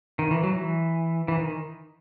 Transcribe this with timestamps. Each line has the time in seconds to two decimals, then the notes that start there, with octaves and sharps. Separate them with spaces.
0.19 D#3
0.31 E3
0.43 F#3
0.55 E3
1.28 E3
1.40 D#3